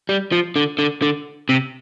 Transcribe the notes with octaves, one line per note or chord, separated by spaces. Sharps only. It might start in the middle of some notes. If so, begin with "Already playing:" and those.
G3
F3
D3
D3
D3
C3